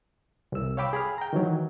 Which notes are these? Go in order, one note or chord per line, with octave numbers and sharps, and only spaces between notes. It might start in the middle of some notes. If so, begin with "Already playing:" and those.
C2 E6
C#5 F5 G5 B5 D6 E6
G#4 B5 F6
G5 A#5
D#3 E3 F#3